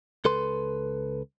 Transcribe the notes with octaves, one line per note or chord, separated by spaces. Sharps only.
C#2 A4 B4 C6